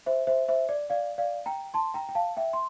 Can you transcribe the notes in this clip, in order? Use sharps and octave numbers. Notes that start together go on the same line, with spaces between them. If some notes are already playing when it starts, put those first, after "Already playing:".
C5 E5
C5 E5
C5 E5
D5
D5 F5
D5 F5
G5 A#5
A5 C6
G5 A#5
G5
F5 A5
E5 G5
C6